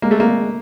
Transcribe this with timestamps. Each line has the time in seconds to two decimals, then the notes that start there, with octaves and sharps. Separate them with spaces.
0.02 G#3 A#3
0.11 A3
0.20 A#3